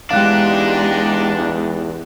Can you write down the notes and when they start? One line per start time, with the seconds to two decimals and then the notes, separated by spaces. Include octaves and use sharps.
0.11 E2 G#3 D4 D#4 G4 F5 F#6